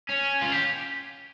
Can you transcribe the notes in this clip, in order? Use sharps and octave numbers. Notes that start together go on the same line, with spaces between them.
C#4
F4
G4